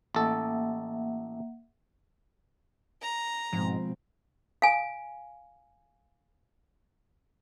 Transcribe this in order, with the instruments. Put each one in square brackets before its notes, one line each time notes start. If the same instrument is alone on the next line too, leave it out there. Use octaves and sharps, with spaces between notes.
[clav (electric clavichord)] A1 A4 [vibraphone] A#3 E5 F#5
[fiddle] A#5
[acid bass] G#2 [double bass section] B2 G#3 C4 [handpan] F3
[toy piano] F5 G#5